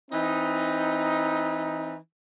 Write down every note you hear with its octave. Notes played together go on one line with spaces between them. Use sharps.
E3 C4 D#4